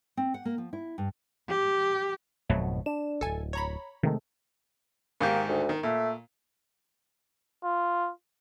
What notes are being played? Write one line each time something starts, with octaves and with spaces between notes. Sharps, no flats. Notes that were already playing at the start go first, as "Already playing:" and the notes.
C4
F#5
A#3
F3
E4
G2
G4
G#1 F2 B2 F#3 A3
D4 E7
D1 G#1 A4 G#5
C#5 A#5 B5
C3 D#3 G#3 A3
G#2 D#3 A#3 G4
D2
D#3
A#2 A3
F4